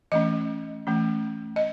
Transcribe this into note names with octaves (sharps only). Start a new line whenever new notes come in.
E3 A3 C#4 D#5
E3 A3 C#4
D#5